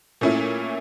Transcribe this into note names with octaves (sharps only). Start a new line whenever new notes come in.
A#2 A3 C#4 E4